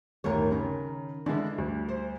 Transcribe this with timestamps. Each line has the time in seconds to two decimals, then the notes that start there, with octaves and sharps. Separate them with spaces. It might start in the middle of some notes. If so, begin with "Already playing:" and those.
0.24 G1 D#2 A2 D#3 A#4 C#5
0.51 C#3
1.26 D3 E3 G#3 D4 E4
1.58 D2 G3
1.89 C5